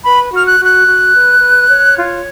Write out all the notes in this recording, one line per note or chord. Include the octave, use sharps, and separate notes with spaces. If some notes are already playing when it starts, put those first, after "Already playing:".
B4 B5
F#4 F6
F#6
F#4
F#6
F#4
B4
B4
C#5
F4